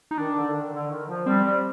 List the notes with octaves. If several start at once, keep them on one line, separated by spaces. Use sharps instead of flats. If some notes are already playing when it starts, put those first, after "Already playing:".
D#4
D#3 D4
D3
D3
D#3
D3
D#3
F3
G3 C4
G3